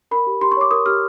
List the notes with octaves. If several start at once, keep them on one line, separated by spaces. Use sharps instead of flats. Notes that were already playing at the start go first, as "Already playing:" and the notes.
A#4 B5
G4
G4 C6
C#6
C#5 D6
A#4 D#6
G4 F6